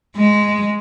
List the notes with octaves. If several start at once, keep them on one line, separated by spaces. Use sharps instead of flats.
G#3